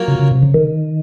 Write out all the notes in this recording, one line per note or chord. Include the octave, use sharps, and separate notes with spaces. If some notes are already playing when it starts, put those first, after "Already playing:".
Already playing: F#3 A#3 F4
C#3
C#3
C3
C#3
D#3